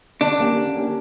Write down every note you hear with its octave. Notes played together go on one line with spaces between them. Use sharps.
D3 D4
A#3 C#4 G4
D3
A#3 C#4 G4